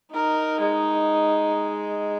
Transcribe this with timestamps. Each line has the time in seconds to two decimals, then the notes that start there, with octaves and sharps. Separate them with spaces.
0.14 D#4 A#4
0.60 G#3